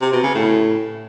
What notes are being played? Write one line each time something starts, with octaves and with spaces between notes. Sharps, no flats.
C3
B2
C#3
A2